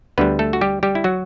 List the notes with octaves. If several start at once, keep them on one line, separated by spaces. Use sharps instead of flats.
D2 D3 G3 B3 B4
A3 A4
F#4
G3 G4
G3 G4
E4
F#3 F#4